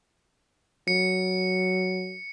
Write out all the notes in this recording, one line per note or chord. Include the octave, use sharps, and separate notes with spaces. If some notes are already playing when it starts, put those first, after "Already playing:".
F#3 C#7